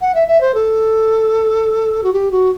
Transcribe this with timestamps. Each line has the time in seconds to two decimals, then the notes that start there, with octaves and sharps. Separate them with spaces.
0.01 F#5
0.14 E5
0.28 E5
0.41 C5
0.54 A4
2.04 F#4
2.13 G4
2.31 F#4